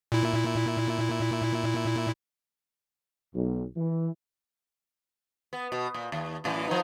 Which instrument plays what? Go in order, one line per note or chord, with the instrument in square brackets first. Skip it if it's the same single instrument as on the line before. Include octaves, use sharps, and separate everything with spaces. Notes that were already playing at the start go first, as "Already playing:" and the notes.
[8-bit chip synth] A#2 E4
[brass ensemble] B1
E3
[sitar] B3
B2
A#2
D#2
F#2 A2 E3
F3 B3 D#4